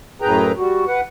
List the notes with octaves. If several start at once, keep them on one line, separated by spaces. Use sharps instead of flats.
F#2 A2 G#4 B4 G5 A#5
G3 F#4
B4 F#5